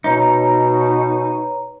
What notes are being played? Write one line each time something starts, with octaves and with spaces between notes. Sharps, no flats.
B2 D#4 B4 C#5 A#5